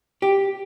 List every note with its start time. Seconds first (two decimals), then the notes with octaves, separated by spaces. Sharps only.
0.22 G4